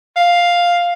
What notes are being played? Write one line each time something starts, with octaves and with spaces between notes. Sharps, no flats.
F5